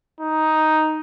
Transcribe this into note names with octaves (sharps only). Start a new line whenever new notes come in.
D#4